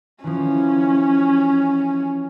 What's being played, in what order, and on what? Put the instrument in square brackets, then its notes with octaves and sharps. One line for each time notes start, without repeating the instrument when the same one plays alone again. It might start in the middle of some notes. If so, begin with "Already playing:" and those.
[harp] E3 F3 [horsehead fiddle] C#4